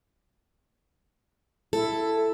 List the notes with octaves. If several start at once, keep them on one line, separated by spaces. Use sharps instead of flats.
E4 A4